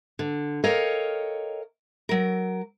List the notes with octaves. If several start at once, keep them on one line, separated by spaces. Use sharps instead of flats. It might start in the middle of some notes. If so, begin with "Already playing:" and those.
D3
A4 A#4 C#5 D#5 F5 G5
F#3 A#4